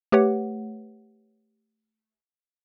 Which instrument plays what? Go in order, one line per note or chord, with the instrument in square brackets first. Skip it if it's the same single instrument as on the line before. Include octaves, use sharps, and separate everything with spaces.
[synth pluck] A3 G4 B4 C#5 F#5